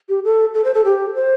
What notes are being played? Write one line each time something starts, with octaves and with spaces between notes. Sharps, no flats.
G4
A4
A4
C5
A4
G4
C5